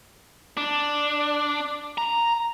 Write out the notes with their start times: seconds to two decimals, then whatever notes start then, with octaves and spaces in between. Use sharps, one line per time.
0.57 D4
1.98 A#5